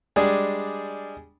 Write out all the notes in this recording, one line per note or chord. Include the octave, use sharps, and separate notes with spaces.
G3 G#3 D4 G#4